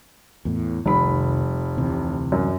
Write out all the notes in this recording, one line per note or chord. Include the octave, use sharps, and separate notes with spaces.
E2 A2
F1 C2 F2 D#3 B5
D2 C3 E3
F#2